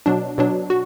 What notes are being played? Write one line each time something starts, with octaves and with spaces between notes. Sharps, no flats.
B2 F#3 D4
B2 F#3 D4
F#4